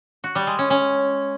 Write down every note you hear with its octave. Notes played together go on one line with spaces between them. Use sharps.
F#4
G3
G#3
C#4
C#4